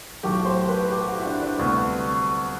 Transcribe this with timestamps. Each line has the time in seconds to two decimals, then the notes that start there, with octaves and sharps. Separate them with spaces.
0.23 B1 A2 F#3 A3 G4
0.45 C5
0.69 B4
0.91 G4
1.08 F#4
1.18 E4
1.25 D4
1.42 D4
1.58 D2 C3 G3 B3